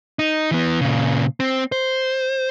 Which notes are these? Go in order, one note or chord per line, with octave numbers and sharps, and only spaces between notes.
D#4
E3 B3
A#2 C#3
C4
C5